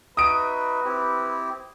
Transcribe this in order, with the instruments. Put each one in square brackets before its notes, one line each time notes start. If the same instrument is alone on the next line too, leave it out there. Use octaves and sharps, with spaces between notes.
[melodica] D#4 F#4 E5 [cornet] B4 [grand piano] D#6 D7
[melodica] C4 E4 G4